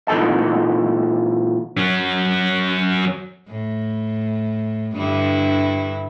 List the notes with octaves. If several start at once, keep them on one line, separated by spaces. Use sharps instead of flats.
A#2 E3 C4 D#4 A4 A5
F#3 C#4
A2
G2 D3 E4